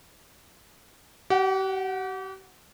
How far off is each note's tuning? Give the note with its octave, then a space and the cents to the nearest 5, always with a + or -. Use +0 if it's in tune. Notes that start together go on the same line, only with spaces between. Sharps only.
G4 -40 F#5 +0